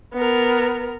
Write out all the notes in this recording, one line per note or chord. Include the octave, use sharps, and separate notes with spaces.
B3 A#4